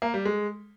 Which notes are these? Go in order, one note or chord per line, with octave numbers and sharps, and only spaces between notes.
A#3
G3
G#3